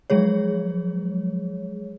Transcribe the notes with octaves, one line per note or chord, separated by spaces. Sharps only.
F3 F#3 G#3 G#4 C#5